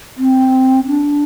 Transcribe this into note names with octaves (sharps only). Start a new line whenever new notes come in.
C4
D4